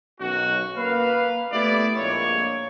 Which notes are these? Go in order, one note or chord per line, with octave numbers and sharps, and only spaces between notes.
B1 D#3 F#3 C#4 F#4
A#3 B4 F5
A3 B3 E4 G4 D5
A#1 F2 G#3 A#3 C#5